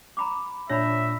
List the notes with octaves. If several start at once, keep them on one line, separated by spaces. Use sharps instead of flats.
A#5 B5 D6
A#2 D4 C#5 D5 E5 B5 A#6